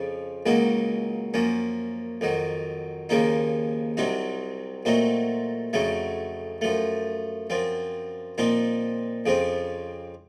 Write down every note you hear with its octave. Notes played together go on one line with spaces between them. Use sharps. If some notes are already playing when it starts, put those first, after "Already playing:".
Already playing: F2 C#3 F3
C#2 C#3 F#3 A#3 D#4
F#2 F3 A#3 C#4
F2 D#3 F#3
D#2 C#3 F3 A#3 D#4
C2 C3 F#3 C4 D#4
A#2 F#3 A3 C4 D#4
F2 C#3 F#3 A3
F#2 F3 A3
F#2 F3 C4
A#2 F3 C4 D#4
F2 C#3 F3 C4